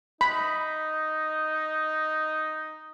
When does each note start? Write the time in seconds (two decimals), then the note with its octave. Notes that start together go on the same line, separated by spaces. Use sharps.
0.21 D#4 B5